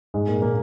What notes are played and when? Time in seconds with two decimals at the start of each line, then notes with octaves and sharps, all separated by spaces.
0.14 G#2 G#3
0.27 A#2 A#3
0.42 A#2 A#3